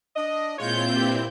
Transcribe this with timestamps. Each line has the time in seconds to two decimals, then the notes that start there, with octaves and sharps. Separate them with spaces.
0.16 D4 D#5
0.59 A#2 G#3 C4 E4 F4 C#5 G6
0.96 G2 G4